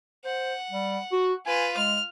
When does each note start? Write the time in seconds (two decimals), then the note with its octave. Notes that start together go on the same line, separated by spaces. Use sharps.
0.25 C5 F#5
0.70 G3
1.12 F#4
1.46 F4 B4 G#5
1.77 G#3 F6